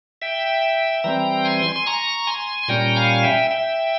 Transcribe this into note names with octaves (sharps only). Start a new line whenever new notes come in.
E5 G5
E3 G3 C4 G5 A#5
G#5 C6
C6
A#5 C#6
G#5 C6
C6
A#2 G3 C#4 G5 A#5
F5 G#5
E5 G5
E5 G5